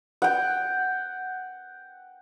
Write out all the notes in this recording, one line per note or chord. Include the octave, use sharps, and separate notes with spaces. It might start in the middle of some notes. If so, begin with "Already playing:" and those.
F#5 G5